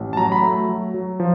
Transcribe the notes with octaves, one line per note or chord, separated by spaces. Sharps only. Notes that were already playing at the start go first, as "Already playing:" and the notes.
Already playing: A1
A5
F#3 A#5
B5
A3 A#5
F#3
F#3
F3